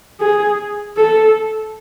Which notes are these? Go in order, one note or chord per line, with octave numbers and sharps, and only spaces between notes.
G#4
A4